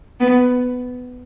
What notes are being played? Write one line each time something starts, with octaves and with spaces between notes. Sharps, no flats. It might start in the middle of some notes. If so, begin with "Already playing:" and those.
B3